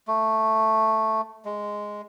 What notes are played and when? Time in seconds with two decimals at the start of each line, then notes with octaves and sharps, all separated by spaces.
0.07 A3
1.45 G#3